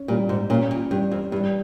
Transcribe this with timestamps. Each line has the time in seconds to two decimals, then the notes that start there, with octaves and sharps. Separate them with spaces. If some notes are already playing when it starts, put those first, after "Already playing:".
Already playing: C#4
0.08 A#2 G3
0.29 G#2
0.50 A#2 C#4
0.71 A#2
0.91 G2 G3
1.11 F2
1.32 G2 G3